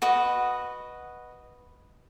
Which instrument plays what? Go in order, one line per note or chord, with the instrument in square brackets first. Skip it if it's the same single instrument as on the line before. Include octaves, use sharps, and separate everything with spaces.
[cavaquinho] F#4 B4 D#5